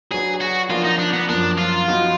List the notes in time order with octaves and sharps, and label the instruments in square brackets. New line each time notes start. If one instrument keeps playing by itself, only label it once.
[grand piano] F#3 D4 F#4 B4 [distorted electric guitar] G#4
[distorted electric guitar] F#4
[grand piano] F3 A#3 D4 [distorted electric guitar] F4
[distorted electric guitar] D#4
D4
B3
[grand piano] F#2 F3 A#3 [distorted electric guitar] D4
[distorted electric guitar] F4
[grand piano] F3 B3 D#4 F#4